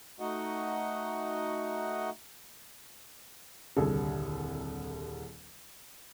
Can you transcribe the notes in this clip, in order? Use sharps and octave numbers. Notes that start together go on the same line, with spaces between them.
A3 D#4 F#4 D#5 F#5
D#1 C2 D3 G3 G#4 A4